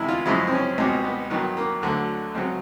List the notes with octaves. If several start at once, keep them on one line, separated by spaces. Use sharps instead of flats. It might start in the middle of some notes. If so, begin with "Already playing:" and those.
Already playing: E2 C3 E3 G#3 E4
F4
F#2 C#3 F3 G#3 E4
C4
C#4
C#2 B2 G3 C4
B3
G2 D#3 F#3 B3
A#3
D2 D3 F#3
C#2 C#3 F#3 C4